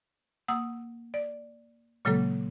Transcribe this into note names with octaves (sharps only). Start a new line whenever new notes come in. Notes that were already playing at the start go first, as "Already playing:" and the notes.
A#3 F#5 D#6 E6
D5
A#2 C#3 F#3 G#3 A#3 A4